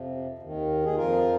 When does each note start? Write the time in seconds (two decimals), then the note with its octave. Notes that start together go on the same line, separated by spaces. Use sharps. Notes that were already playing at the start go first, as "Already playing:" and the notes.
Already playing: F2 C3 F3
0.39 D#2 D#3
0.84 G#4
0.95 F2 F3 F4 A#4